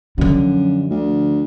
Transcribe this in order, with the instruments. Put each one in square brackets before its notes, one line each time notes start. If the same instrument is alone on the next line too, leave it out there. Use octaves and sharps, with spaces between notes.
[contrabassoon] F#2 [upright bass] D3 F3
[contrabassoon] D2